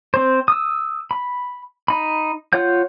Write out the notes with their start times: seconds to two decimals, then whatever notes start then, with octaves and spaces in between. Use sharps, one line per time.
0.14 C4 C5
0.48 D#6 E6
1.11 B5
1.88 D#4 B5
2.53 F4 C#5 F#5 G6